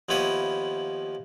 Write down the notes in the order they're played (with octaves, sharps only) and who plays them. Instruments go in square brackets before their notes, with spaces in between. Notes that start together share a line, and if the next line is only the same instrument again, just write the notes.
[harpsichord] D#2 F3 B3 E4 C#5 D#6